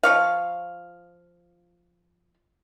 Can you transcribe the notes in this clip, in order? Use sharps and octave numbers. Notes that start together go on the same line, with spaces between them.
F3 C#5 F5